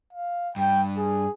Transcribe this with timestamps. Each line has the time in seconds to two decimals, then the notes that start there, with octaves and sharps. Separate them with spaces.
0.13 F5
0.56 G2 G5
0.97 G#4